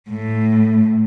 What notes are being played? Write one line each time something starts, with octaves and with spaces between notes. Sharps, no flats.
A2